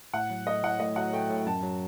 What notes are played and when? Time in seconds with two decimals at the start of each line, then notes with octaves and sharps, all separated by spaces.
0.14 A2 F#5
0.30 F#3
0.47 A3 D#5
0.64 A2 F#5
0.80 A2 D#5
0.96 F#3 F#5
1.13 A3 G5
1.30 A2
1.46 F#2 A5
1.63 F#3